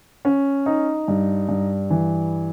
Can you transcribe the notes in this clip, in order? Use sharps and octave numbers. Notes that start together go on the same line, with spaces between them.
C#4
D#4
G2
G2
E3